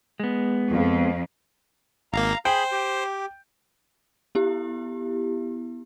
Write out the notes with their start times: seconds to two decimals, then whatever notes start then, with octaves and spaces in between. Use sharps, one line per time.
0.20 G#3 B3
0.71 F2
2.13 G#1 A#3 F5 A#5
2.45 G#4 C5 G5 B5
2.72 G4
4.35 B3 E4 G4